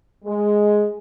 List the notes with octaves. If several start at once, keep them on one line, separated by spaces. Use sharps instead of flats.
G#3